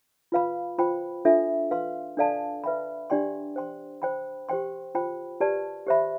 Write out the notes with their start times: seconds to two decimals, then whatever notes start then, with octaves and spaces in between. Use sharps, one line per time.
0.32 F4 B4 F5 B5
0.78 F4 C5 G5 B5
1.25 D4 F4 A4 E5
1.71 B4 F5 C6
2.17 D4 A4 D5 F5 A5
2.64 B4 E5 G5 B5
3.10 D4 G4 D5 G5 C6
3.56 C5 G5 C6
4.02 C5 G5 B5
4.49 G4 C5 G5 C6
4.95 F4 C5 G5 B5
5.40 G4 B4 D5 A5
5.87 G4 C5 E5 B5